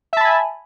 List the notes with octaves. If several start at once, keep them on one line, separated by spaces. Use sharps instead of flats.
E5 G#5 A5 B5